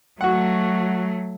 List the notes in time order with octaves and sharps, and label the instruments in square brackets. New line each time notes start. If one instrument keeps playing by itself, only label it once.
[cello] F#3 A3 [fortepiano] F#4 F#5